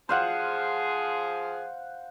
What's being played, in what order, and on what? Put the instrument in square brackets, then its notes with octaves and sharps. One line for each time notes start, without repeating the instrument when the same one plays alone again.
[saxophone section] F3 G#4 [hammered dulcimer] C5 F5 F#5